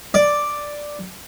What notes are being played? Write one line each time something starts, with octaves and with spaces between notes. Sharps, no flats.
D5